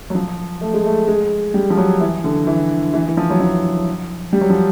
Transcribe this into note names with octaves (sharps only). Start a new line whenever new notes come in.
F#3
F3
A3
G#3
A3
G#3
G3
F3
F#3
E3
D3
E3
E3
E3
F3
F#3
F3
G3
F#3
F3